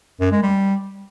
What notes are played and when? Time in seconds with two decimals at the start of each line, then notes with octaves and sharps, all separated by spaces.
0.20 F#2
0.31 G#3
0.42 G3